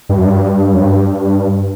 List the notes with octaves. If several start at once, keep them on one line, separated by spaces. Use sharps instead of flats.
G2
F#2
G2
F#2
G2